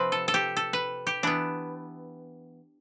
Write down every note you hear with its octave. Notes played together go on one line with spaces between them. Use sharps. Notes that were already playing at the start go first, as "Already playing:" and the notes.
Already playing: C3 F3 C4 B4
A4
A4
G4
A4
B4
G4
E3 B3 D4